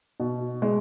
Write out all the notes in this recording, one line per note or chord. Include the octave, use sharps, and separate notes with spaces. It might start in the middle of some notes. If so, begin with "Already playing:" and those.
B2
G#3